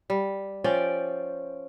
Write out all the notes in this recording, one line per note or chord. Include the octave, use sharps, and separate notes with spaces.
G3
F3 C#4 D5 G5